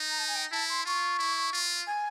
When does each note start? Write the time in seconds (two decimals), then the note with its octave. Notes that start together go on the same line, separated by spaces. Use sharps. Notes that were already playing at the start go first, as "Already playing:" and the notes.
Already playing: D#4
0.09 A#5
0.18 A5
0.27 G#5
0.35 G5
0.52 E4 A5
0.69 C6
0.85 F4 C#6
1.19 E4
1.53 F4
1.86 G#5